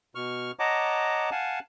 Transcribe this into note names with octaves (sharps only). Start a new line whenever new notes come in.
B2 C#6 F6
C#5 D#5 F#5 A5 A#5 D6
F5 F#5 G#5 A5